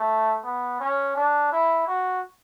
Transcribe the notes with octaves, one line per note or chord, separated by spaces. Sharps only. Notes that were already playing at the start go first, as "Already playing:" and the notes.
Already playing: A3
B3
C#4
D4
E4
F#4